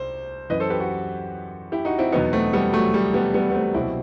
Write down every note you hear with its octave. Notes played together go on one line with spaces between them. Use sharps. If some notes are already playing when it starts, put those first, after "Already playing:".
Already playing: C2 C5
F#2 E3 B4 D#5
A4 C5
G4 B4
F#4 A4
E4 G4
D#4 F#4
C4 E4
E2 B2 F#3 B3 D#4
A3 C4
G3 B3
F#3 A3
G3
G3 B3
G3 B3
B3
A3 C4
C2 B2 F#3 C4 E4